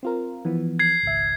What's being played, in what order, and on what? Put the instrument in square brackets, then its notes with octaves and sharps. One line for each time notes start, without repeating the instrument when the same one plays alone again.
[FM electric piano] C4 F4 A#4
E3 F3 B3
[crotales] G#6 C7
[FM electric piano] G#1 C#2 E5